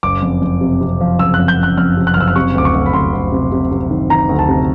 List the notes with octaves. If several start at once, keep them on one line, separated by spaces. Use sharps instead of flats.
F#1 D6
F2
F2
C3
C3
F3
F#1 E6
F#6
F2
G6
F#1 F#6
F2 F6
C3
F#6
F6
F#1 E6
F6
C3 C#6
D2 D6
C#6
D2
B5
D2 C6
D2
C3
C3
C3
D#3
D#3 A#5
D2
A5
C3